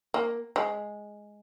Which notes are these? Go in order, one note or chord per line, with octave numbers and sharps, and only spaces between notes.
A#3
G#3